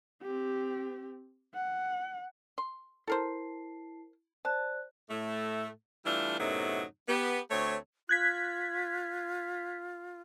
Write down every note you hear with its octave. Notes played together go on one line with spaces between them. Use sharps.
C4 G4
F#5
C6
E4 A4 A#4 C5 A5 C7
C5 D5 A5 F#6
A2 A3
E3 G3 A3 D4 E4 F4
F#2 A2 C3 F#3 B3 D#4
B3 G4
D2 A3 C4 C#5
F4 F#6 G#6 B6